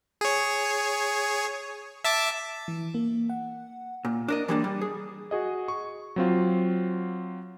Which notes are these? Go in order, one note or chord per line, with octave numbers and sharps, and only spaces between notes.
G#4 C#5
E5 A5 D6
E3
A#3
F#5
A#2
D4 A#4 D#5
E3 G3 G#3 A#3 C#4 D4
G3
G#4
F#4 G#4 D#5
C#6
F#3 C4 F4